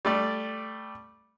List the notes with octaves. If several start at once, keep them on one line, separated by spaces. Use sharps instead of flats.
G3 A3 D5